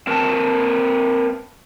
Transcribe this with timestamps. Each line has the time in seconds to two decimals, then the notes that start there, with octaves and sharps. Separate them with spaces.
0.07 C4 A#4 B4 G5 A5